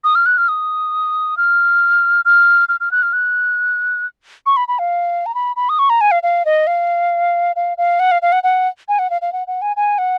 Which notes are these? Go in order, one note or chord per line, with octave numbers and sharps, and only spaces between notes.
D#6
F6
F#6
F6
D#6
F6
F6
F6
F6
F#6
F6
F#6
C#6
B5
B5
F5
A#5
B5
B5
D#6
C#6
A#5
G#5
F5
F5
D#5
F5
F5
F5
F#5
F5
F5
F#5
F#5
G#5
F#5
F5
F5
F#5
F#5
G#5
G#5
F#5